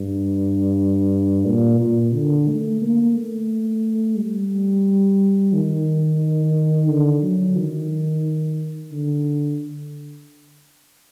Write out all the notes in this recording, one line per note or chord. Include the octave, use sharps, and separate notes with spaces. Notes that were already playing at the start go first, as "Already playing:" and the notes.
Already playing: G2
A#2
A#2
D3
A3
A#3
A3
G3
D#3
D3
F#3
D#3
D3